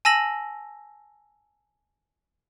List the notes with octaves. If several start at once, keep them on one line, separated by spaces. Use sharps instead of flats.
G#5 A5 E6 A#6 F#7